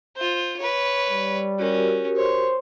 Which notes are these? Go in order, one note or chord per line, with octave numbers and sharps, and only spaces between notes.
F4 C5
B4 C#5
G3
C#4 F#4 G4 A#4
C5 C#5